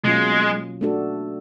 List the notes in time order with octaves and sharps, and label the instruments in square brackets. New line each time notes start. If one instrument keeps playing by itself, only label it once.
[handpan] B2 F#3 A#3 C#4 F4 [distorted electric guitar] G#3
[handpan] A3 D4 F#4 A4